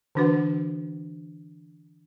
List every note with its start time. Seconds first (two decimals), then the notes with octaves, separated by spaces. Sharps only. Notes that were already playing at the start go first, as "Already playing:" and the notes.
0.15 D3 E3 D4 F#4 B4 F#5